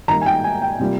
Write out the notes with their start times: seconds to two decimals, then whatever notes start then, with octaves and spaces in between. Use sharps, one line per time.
0.08 D#3 A#5
0.11 G3 A#3
0.21 G#5
0.26 G5
0.44 G#5
0.62 G5
0.80 C3 G3 A#3 F4